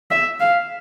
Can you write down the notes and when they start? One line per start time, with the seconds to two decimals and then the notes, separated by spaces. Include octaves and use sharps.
0.11 E5
0.40 F5